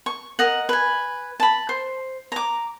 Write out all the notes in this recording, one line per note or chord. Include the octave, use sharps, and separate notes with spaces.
C#6
A#4 D#5 F#5
B4 G#5
A5 B5
C5
A#5 D6